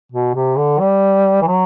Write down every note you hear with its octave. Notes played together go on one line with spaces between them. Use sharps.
B2
C3
D3
G3
E3
F#3